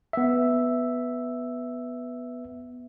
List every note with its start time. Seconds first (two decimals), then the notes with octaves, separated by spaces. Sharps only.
0.13 B3 E5